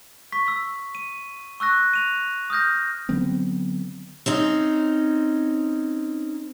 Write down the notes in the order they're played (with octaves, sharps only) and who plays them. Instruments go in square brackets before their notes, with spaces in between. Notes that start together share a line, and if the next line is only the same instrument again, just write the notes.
[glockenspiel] C#6 B6
E6 B6
D#7
C#6 E6 F#6 A#6
D#7 F7
D#6 F6 G6 A#6
[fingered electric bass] D3 F#3 B3 C4
[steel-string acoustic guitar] C4 C#4 D#4